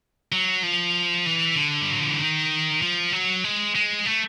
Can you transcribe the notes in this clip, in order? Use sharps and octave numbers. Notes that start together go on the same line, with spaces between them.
F#3
F3
E3
D3
G3
F#3
F3
E3
D#3
F3
F#3
G#3
G#3
A3